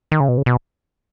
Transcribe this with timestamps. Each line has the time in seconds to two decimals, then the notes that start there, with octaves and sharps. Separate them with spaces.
0.12 D#3
0.20 C#3
0.29 B2
0.38 C#3
0.46 B2